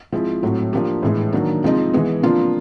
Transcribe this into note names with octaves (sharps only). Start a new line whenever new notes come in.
F3 G#3 C4 E4
A2 F#3 A3 C4
F3 A#3 D4 G4
A2 E3 G#3
D#3 F#3 A#3 D4
C3 F3 G#3 C4 D#4
E3 G#3 B3
C3 F3 A#3 D4 F4